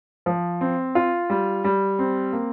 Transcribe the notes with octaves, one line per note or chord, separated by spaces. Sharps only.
F3
C4
F4
G3
G3
C4
A#3